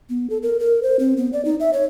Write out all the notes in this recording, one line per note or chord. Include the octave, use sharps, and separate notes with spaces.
B3
A4
A#4
A#4
C5
C4
B3
D5
D#4
E5
C#5